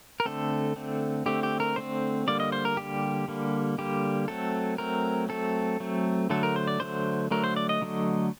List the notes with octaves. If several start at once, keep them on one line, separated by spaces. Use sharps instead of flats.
A#4
D3 A3 C4 A4
D3 A3 C4
D3 A3 C4 G4
G4
A#4
D3 A3 C4 C5
D3 G3 A#3 D5
D#5
C5
A#4
D3 G3 A#3 G4
D3 G3 A#3
D3 G3 A#3 G4
F#3 A3 C4 A4
F#3 A3 C4 A#4
F#3 A3 C4 A4
F#3 A3 C4
D3 F#3 A3 A4
A#4
C5
D5
D3 F#3 A3 C5
D3 F#3 A3 A#4
C5
D5
D#5
D3 F#3 A3